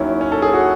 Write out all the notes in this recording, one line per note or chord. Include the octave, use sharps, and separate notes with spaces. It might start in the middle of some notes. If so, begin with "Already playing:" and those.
Already playing: D#2 D#3 F#3 C#4 E4
C#4
A4
G#4
F#4